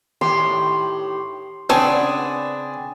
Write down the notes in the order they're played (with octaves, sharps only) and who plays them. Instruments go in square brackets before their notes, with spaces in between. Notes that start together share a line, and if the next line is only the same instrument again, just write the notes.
[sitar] A2 D#3 G4 [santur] C6
[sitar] C#3 B3 D4 [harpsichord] C4 [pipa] C5 C#5 A5 [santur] G#5